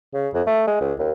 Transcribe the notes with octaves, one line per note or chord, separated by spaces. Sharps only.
C#3
F2
A3
G#3
C#2
D#2